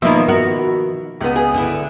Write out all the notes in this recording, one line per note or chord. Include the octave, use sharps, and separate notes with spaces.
B2 D#3 F3 A#3 E5 B5
F#4 A#4
C#2 B3
G#4
D3 E4